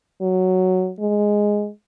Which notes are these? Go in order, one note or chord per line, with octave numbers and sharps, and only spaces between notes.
F#3
G#3